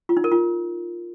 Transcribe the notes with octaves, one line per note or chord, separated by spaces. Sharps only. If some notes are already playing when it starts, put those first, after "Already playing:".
F4
D#4
A#4
F4